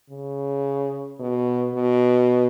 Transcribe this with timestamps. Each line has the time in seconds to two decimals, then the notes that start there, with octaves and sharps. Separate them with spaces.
0.10 C#3
1.20 B2
1.74 B2